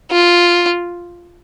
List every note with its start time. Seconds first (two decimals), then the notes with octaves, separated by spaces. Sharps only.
0.11 F4